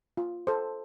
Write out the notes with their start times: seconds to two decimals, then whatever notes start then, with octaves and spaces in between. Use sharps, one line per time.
0.17 F4
0.47 A4 C5